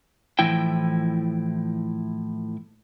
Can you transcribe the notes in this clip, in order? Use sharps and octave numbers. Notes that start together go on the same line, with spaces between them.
A2 E3 F3 E4 G5